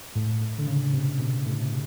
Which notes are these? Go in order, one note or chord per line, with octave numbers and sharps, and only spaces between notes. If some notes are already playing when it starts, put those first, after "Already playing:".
A2
A2
D3
C#3
C3
B2
A2